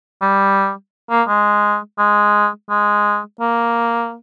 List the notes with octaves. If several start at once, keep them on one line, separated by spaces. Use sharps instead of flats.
G3
A#3
G#3
G#3
G#3
A#3